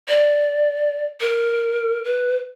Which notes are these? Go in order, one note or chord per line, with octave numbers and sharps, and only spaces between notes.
D5
A#4
B4